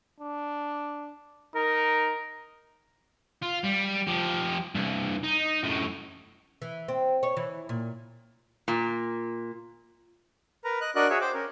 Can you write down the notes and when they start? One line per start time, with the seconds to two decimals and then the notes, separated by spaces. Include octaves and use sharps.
0.20 D4
1.55 D#4 A#4
3.42 F4
3.64 G3
4.07 F3 G4
4.75 C2 G2
5.24 D#4
5.63 F#2 A2
6.62 E3
6.88 C4
7.23 C#5
7.37 E3
7.69 A#2
8.68 A#2
10.64 A#4 B4 A#5
10.81 D#5 F#6
10.95 D4 F#4 A#4 D5 D#5 F#6
11.10 F#4 G#4 C#5 E5
11.21 C5 G5 D6
11.34 C#4 A#4